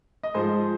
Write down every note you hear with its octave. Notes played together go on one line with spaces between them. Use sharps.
D#5
G#2 F3 G#4 C5